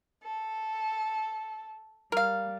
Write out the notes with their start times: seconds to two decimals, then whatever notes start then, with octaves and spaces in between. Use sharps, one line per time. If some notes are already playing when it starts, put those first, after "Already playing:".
0.24 A4
2.12 G3 A#4 F5